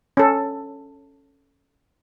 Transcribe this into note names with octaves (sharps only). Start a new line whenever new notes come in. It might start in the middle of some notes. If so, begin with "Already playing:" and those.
C#4 A4